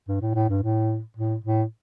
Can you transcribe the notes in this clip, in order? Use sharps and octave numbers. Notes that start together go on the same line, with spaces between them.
G2
A2
A2
G2
A2
A2
A2